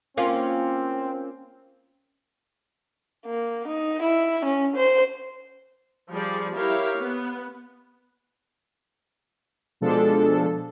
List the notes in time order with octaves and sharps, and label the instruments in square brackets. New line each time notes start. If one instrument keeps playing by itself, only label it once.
[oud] A#3 C#4 F4 [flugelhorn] C4
[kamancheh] A#3
D#4
E4
C#4
C5
[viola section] F3 G3 G#4 D5
E4 G4 A#4 C#5 F5
B3
[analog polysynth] B2 F3 G#3 D4 A4